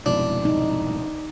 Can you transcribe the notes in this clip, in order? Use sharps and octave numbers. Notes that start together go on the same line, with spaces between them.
C2 F2 G#2 B2 D4 E4
D#4